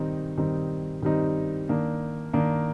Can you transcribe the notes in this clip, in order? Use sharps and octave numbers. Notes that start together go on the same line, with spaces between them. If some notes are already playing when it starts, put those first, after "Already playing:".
Already playing: D#3 G3 C4 D#4
D#3 G3 C4 D#4
D#3 G3 C4 D#4
D#3 A#3 D4
D#3 A#3 D4